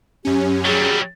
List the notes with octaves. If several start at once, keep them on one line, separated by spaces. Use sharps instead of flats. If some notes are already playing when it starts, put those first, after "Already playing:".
F#2 C#4 G4
F#3 G3 G#4